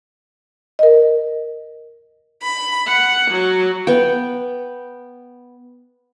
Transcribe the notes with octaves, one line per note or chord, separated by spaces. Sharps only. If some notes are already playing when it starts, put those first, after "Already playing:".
A#4 D#5
B5
F#5
F#3
B3 G5